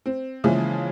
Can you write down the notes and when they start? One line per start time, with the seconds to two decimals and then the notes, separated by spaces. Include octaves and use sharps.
0.06 C4
0.44 C#3 E3 F3 G#3 A#3